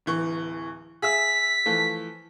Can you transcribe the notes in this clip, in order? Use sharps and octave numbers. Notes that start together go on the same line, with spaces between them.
D1 E3 C#6
G#4 E5 E6 B6
E3 F3 A3